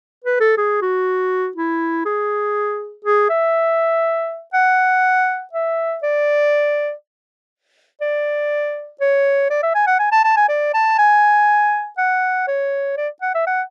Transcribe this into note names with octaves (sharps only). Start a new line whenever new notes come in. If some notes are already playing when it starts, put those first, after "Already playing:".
B4
A4
G#4
F#4
E4
G#4
G#4
E5
F#5
E5
D5
D5
C#5
D5
E5
G#5
F#5
G#5
A5
A5
G#5
D5
A5
G#5
F#5
C#5
D5
F#5
E5
F#5